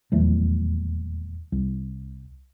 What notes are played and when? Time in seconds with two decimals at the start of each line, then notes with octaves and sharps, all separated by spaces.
0.12 D#1 E2 F#3 A3
1.52 C2